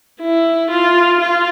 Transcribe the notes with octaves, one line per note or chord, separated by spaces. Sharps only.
E4
F4
F4